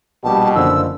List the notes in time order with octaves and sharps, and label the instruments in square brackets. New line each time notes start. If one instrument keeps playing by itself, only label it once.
[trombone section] A#1 G3 G4 [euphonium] B2 [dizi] A5
[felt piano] F#1 D3 [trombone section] F3 [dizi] E6